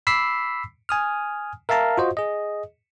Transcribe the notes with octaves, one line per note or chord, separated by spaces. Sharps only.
B5 D6 E6 B6 C7
G#5 D#6 F6
A#4 E5 F5 A5 A#5
F4 F#4 C5 D#5
G#4 D#5